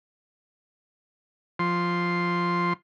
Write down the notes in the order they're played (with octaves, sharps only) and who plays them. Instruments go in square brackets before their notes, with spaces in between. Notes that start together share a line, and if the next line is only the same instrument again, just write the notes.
[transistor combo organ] F3 C6